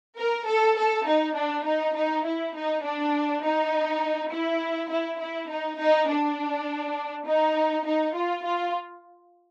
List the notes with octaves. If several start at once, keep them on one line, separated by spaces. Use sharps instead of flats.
A#4
A4
A4
D#4
D4
D#4
D#4
E4
D#4
D4
D#4
E4
E4
E4
D#4
D#4
D4
D#4
D#4
F4
F4